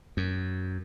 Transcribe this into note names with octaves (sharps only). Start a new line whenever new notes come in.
F#2